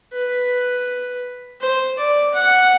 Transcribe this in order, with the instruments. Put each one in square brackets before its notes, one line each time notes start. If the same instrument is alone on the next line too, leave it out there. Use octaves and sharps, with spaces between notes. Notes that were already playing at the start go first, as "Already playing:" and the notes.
[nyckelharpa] B4
C5
D5
F#5